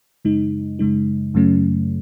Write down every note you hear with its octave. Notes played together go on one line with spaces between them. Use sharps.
F#2 C#3 G#3 D#4
F#2 C#3 G#3 D#4
F#2 C#3 F#3 A3 C#4